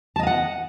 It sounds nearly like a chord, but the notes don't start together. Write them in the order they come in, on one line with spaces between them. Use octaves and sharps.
A5 D#5 F5 F#5